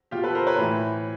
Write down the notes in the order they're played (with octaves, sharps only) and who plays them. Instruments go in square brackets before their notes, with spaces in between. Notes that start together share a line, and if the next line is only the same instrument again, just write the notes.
[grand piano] B2 F4 G4
A4 B4
A#4 C5
B4 C#5
A2 E3